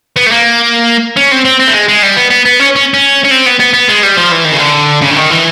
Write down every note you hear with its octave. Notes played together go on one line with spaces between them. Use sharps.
B3
A3
A#3
C#4
C4
C4
C4
A3
G#3
G#3
G3
B3
B3
B3
C#4
C#4
C#4
C#4
C4
B3
B3
B3
G#3
G3
F3
E3
D#3
C#3
D3
C#3
D3
D#3
E3